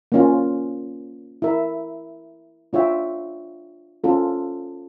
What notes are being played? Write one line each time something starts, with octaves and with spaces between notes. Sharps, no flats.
A#3 C#4 F4
E4 A#4 E5
D4 F4 C#5 E5 G5
C#4 F4 A4